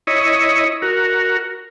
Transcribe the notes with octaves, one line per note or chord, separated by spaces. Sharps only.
E4 C#5 D#5
F#4 A#4